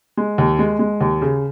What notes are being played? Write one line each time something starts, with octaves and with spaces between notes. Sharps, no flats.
G#3
D#2
G#3
G#3
D#2
C#3